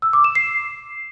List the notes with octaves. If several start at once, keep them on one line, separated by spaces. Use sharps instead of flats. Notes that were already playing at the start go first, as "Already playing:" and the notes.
E6
D6
E7
C7